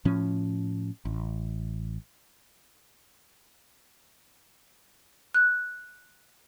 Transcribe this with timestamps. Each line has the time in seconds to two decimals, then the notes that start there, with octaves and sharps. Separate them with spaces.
0.05 A2 F3 C#4
1.05 A1
5.34 F#6